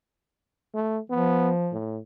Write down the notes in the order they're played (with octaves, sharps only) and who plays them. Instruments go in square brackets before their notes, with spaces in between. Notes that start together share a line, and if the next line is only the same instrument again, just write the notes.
[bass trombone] A3
[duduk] F3 [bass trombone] B3
[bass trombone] A2